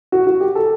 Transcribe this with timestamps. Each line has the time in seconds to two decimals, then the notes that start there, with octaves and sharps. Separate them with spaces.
0.12 F#4
0.27 F#4
0.41 G4
0.55 A4